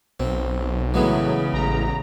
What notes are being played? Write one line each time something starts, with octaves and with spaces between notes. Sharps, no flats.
B1 C4
A2 C#3 E3 F#3 G#3 B3
A1 A#5